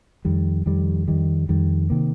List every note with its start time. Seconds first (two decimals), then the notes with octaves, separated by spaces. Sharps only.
0.25 F2 D#3 G3
0.66 F2 D#3 G3
1.08 F2 D#3 G3
1.49 F2 D#3 G3
1.90 C3 D#3 A#3